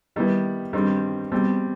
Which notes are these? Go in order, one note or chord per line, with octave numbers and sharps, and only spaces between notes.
D#3 G3 B3 E4
G2 D#3 G3 C4
B2 G3 C4